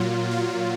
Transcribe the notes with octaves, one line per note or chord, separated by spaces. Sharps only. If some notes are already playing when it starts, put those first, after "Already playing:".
Already playing: A#2 F#3 F4
F4